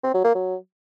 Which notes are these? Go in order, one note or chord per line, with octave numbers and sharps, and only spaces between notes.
C4
F#3
A#3
F#3